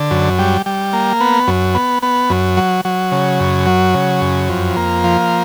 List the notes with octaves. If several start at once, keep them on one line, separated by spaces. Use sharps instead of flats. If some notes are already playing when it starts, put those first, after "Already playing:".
Already playing: D3
F#2
G3
G3
A#3
B3
F#2
B3
B3
F#2
F#3
F#3
C#3
F#2
F#3
C#3
F#2
F2
A#3
F3